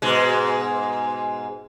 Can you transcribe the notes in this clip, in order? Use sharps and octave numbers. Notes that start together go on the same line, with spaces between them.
G#2 B2 G#3